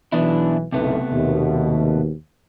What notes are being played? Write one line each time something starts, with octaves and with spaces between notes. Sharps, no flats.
B1 E3 B3 D4 E4
F#1 B1 C3 A3 B3
D#2 B2